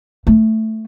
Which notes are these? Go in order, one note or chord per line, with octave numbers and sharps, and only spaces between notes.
A3